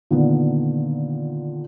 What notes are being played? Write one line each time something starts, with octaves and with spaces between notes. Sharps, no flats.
A#2 D3 D#3 B3